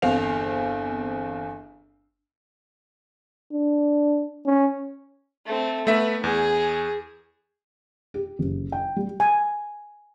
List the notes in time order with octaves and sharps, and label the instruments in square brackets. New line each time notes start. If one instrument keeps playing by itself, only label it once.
[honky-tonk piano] G1 E2 C4 F5 F7
[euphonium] D4
C#4
[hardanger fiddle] A3 C4
[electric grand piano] A3 E5 [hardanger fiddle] B3
[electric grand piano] E2 [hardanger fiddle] G#4
[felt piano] G4
F#1
G5
G3
[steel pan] G#5